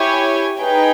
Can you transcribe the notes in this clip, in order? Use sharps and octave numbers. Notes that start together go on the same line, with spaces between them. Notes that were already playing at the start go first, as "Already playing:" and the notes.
Already playing: E4 G4 C#5 G#5
D#4 G#4 B4 G5